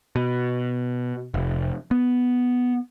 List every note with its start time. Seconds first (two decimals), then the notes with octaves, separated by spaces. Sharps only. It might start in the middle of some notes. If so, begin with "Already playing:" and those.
0.16 B2
1.34 F1
1.91 B3